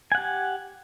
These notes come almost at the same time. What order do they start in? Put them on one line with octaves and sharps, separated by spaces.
G#5 F#5 G4